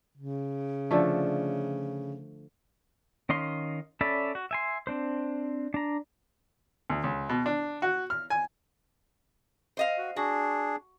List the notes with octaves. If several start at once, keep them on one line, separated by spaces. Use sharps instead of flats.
C#3
D3 F3 A3
D#3 C#4 D#5 F5 C6
C#4 A4 D5 E5 B5
F#4
E5 G#5 C6
C4 D4 C5
D4 A#5
D2
C#2
B2
D4
F#4
F6
G#5
C5 D#5 F5
F#4
D4 F#4 G#4